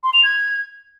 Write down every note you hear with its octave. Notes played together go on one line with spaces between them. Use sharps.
C6
F7
G#6